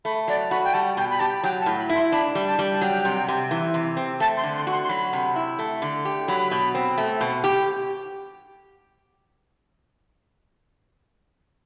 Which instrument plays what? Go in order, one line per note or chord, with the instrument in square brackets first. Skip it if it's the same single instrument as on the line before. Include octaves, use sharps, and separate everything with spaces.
[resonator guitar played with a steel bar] A3 [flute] B5
[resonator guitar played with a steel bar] F#3 [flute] D5
[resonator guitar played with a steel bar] F#4 [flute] B5
[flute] G5
[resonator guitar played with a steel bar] G3 [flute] A5
[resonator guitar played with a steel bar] B2 [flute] G5
[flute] B5
[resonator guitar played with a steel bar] G4 [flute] A5
[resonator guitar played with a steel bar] F#3 [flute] G5
[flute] A5
[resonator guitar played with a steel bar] A2
[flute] B5
[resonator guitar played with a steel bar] E4
[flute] C6
[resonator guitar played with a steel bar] D4 [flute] B5
[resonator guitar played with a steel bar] G3
[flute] A5
[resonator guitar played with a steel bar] G3
[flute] A5
[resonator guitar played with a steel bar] F#3 [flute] G5
[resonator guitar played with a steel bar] C3
C3
E3
C3
C4
[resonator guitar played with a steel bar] A3 [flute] A5
[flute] C6
[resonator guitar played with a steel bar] D3
[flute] C6
[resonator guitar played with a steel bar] F#4
[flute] C6
C6
[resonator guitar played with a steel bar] F#3 [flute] B5
[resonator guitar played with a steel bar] C3
E4
A3
D3
G4
[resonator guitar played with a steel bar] F#3 [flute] B5
[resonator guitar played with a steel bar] B2
C4
A3
B2
G4